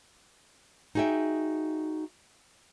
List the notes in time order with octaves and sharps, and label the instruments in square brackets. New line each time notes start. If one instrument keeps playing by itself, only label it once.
[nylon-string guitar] D#4 F#4 G#4 D5 E5 G5